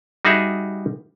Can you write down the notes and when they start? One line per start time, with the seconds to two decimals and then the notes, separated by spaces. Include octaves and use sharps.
0.25 G3 D#4 F#4 G#4 E5